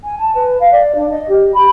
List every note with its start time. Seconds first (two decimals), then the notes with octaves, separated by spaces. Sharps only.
0.04 G#5
0.19 A5
0.35 B4
0.60 F5
0.72 D5
0.95 D4
1.10 D#5
1.29 G4
1.54 B5